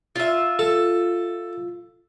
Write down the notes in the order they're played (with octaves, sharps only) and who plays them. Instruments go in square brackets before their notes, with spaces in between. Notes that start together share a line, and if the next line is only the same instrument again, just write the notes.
[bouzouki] F4 E5
[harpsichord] A4